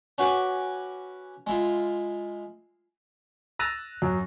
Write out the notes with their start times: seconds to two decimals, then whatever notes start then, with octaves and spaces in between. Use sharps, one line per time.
0.18 C#4 F#4 B4 G#5 D6
1.47 G#3 E4 F4
3.59 E6 F#6 A6 A#6 D#7 F7
4.02 F#2